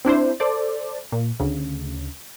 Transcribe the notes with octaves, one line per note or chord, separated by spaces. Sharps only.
C4 D4 E4 C5
A4 C5 D5
A#2
D2 C#3